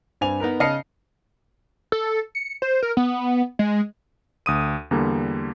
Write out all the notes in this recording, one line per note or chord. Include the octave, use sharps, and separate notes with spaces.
G2 C4 G#5 F7
B3 D#4 A#4 B4
C#3 D#5 A5 F6 C7 C#7
A4
C#7
C5
A#4
B3
G#3
D2 D#6 D#7
E2 D3 G3 A#3